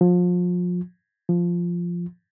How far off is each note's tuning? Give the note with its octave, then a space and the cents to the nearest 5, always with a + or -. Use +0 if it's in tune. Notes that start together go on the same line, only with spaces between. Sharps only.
F3 +30
F3 -5